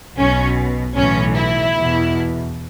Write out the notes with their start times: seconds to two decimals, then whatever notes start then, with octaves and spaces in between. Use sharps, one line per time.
0.18 B1 B2 C#4
0.97 B1 A2 E3 C#4
1.36 E4
1.75 E2 B2